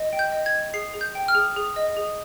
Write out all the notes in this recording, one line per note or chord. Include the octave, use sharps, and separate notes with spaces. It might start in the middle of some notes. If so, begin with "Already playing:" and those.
Already playing: D#5
G5
G6
D#5
G#6
D#5
G#4 C7
G#4
G6
G5
F6
G#4
G#4
D#5
G#4